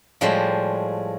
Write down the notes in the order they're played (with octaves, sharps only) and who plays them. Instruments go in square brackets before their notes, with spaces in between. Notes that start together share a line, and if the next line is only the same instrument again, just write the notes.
[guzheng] A2 F3 G3 G#3 C5 B5